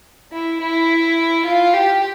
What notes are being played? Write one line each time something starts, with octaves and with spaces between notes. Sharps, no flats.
E4
E4
F4
G4